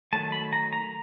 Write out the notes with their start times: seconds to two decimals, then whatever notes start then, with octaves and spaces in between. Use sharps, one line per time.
0.13 D#3 F#3 A3 A5
0.32 B5
0.53 A#5
0.73 A#5